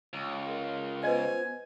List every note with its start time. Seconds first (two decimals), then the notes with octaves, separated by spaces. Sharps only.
0.13 C#2
0.46 G#4 A#4 C6
1.04 B3 F4 B4 C5 D#5 G#5